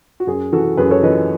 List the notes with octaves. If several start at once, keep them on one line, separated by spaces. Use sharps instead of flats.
F#4
F#2 G#4
E3 F#4 A4
F#2 G#4 B4
A4 C#5
E3 B4 D#5